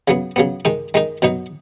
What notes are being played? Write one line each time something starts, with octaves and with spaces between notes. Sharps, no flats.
C#3 F#3 B3
C#3 F#3 B3
D#3 G#3 D#4
D#3 G#3 D#4
B2 F#3 B3 D#4